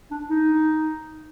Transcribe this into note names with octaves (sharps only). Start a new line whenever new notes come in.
D4
D#4